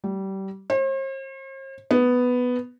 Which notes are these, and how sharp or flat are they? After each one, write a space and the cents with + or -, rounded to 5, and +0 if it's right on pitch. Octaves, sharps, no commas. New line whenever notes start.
G3 -25
C5 +45
B3 +5